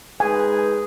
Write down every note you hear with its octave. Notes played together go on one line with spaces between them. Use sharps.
G#3 D#4 G#4 B4 G#5